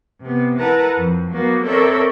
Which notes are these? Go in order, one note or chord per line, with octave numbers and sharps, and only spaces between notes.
C3 B3
E4 A#4 B4 F#5 A5 A#5
F2
F#3 A#3 B3 F#4
C4 A4 A#4 C#5 D5 E5